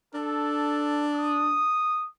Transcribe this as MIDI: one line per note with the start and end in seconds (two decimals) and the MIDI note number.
0.14 1.63 62
0.14 1.06 69
1.14 2.05 87